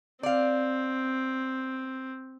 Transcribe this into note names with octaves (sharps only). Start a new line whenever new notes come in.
C4 D5 F5